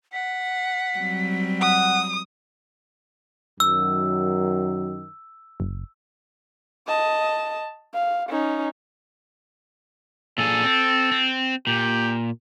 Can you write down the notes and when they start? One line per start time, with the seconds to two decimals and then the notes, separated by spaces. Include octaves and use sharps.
0.13 F#5 B6
0.97 F#3 G3 C4
1.61 F#5 D#6
3.60 F#2 D#3 F#3 E6
5.60 F#1
6.88 D#5 A5
7.94 F5
8.29 C#4 D#4
10.38 A#2 G#4 A4
10.64 C4
11.12 C4
11.67 A#2 G4